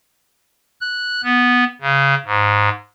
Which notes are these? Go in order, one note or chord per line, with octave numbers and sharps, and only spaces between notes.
F#6
B3
C#3
G#2